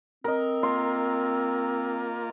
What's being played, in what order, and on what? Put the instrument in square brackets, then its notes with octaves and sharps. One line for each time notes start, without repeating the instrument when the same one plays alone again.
[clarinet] C4 [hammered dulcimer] A#4 D#5
[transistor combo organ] A#3 F4 [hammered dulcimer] C6